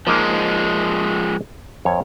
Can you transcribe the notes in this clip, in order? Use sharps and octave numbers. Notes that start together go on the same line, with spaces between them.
F3 G#3 A#3 D#4
F2 C#5